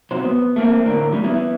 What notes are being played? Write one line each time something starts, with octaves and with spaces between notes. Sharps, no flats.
C3 F#3 C5
B3
A3 A#3 C4
A2 D3 A#4
G3 C#4
B3 E4